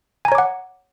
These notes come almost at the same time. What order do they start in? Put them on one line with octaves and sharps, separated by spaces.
G#5 A#5 C#5 D6 F#5